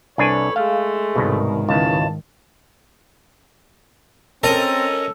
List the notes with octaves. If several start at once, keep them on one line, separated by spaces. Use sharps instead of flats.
C2 D4 A4 B4 C#5 G#5
G#3 A3 F5
C2 G#2 B2 D#3
C#2 F#2 B2 E3 A5
C4 C#4 A4 A#4 D#5